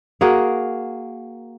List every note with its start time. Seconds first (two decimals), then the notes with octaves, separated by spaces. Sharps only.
0.21 A#3 F#4 G#4 A#4